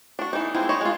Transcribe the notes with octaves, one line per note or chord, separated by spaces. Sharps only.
D4 F#4
E3 D#4
E3 F3 G#3 C4
E4 C#5 D#5
G#3 F4